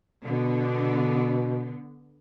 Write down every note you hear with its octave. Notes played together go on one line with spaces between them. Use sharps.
B2 D3 B3